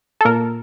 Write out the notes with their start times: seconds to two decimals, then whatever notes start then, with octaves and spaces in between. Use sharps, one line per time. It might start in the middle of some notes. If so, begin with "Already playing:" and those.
0.21 A4
0.25 A#2 A#4